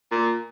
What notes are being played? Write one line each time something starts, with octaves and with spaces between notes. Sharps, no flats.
A#2